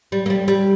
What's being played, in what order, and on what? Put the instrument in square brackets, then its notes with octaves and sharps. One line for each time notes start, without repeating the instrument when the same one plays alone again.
[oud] G3
A#3
G3
G3